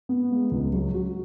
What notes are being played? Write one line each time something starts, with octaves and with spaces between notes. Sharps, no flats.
B3
G#3
C#2
F#3
F#4